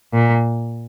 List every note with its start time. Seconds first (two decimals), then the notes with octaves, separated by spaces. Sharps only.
0.13 A#2